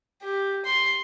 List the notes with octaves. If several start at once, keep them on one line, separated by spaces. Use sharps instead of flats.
G4
C6